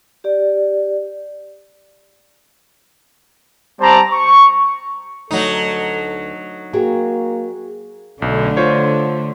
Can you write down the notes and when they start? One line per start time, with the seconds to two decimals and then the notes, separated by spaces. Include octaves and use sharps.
0.24 G4 D5
3.81 G3 C4 C5 D5 A5 A#5
4.12 C#6
5.31 D2 F#3 D#4 A4
6.73 A#3 F#4 G#4 G5
8.22 B1 D3 A3
8.57 F4 C5 C#5